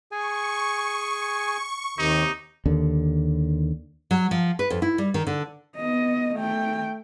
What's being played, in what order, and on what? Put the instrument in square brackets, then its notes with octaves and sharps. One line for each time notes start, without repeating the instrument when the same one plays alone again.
[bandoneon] G#4 G#5 [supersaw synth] C#6
[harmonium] D#2 D#3 [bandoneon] C3 [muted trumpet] D#4
[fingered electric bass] D#2 D3
[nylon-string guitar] F#3
F3
B4
F2
E4
G3
D#3
D3
[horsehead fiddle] B3 D#5
A3 G5